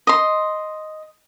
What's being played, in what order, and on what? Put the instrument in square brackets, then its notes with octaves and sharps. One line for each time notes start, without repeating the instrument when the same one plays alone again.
[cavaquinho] D#5 C6